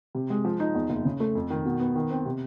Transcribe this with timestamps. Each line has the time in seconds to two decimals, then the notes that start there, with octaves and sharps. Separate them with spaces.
0.15 C3
0.30 G#3
0.45 F3
0.60 D#4
0.75 E2
0.90 F#1
1.05 C#3
1.20 A3
1.35 F2
1.50 D#3
1.65 B2
1.80 B3
1.95 D#3
2.10 C4
2.26 C3